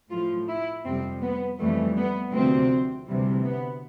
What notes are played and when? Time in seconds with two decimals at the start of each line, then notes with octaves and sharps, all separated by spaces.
0.11 A2 F3 F4
0.48 E4
0.85 F2 C3 G3 C4
1.21 B3
1.59 F2 E3 G3 A3
1.97 B3
2.33 D2 C3 F3 C4
3.07 D2 C3 E3 G3
3.44 B3